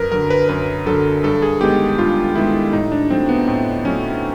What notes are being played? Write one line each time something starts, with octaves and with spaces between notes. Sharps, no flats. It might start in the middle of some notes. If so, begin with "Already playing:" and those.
Already playing: F#2 A#4 B4
D3 F#3 A#4
B4
F#2 B4
D3 F#3 A4
G2 A4
G#4
D#3 G#3 B3 G4
G2 F4
D#3 G#3 B3 E4
A2 D#4
D4
F#3 A3 C4
B3
A2 C4
F#3 A3 C#4